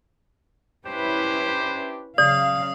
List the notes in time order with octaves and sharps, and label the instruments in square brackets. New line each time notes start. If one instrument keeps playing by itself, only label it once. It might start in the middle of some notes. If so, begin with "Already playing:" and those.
[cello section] C#4 E4 B4 [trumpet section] D4 G4 C5
[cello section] C#3 F#3 F5 [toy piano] D5 [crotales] D#6